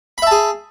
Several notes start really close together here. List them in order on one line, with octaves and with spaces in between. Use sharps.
B5 E5 A5 G#4